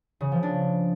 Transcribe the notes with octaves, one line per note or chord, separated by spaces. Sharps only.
C#3
F3
D4